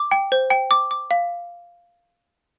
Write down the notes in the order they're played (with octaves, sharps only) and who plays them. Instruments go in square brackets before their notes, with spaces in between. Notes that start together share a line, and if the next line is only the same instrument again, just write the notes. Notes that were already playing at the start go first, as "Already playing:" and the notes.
Already playing: [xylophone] D6
G5
C5
G5
D6
D6
F5